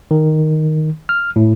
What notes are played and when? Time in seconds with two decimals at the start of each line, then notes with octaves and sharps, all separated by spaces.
0.11 D#3
1.09 F6
1.36 A2